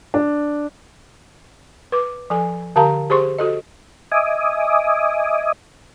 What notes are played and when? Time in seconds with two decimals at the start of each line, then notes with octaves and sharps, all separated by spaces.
0.14 D4
1.92 B4 D6
2.30 F3 A4 G#5
2.76 D3 G4 A#4 F5 A5 A#5
3.10 G4 G#4 C5 C6 C#6
3.39 F#4 A4 D#5
4.12 D#5 E5 G#5 D6 D#6